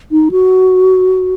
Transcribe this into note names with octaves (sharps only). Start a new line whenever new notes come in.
D#4
F#4